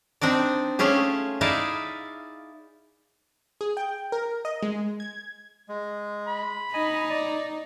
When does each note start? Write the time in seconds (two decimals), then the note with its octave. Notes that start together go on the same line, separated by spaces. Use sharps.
0.21 C4 D4 D#4 D5
0.79 A3 C#4 F4 G4 G#4
1.41 D#4 E4 G#4 D5 E5 F5
3.61 G#4
3.77 G5
4.12 A#4
4.45 D#5
4.62 G#3
5.00 G#6
5.69 G#3
6.27 B5
6.74 D#4 D#5 G#5
7.10 D5